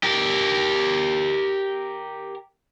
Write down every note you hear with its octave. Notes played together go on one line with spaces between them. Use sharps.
G4 A#4